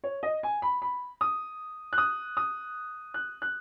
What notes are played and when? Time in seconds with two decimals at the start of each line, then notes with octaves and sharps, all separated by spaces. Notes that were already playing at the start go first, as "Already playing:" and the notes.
0.03 C#5
0.23 D#5
0.43 G#5
0.62 B5
0.82 B5
1.21 D#6
1.93 F#6
1.98 D#6
2.37 D#6
3.14 F#6
3.42 F#6